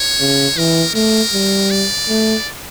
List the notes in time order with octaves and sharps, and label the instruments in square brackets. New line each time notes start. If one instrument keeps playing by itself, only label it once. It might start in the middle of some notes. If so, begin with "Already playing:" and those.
Already playing: [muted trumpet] C#5
[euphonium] C#3
[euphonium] E3 [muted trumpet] A#4
[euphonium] A3 [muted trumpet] A#4
[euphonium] G3
[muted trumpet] D5
[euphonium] A3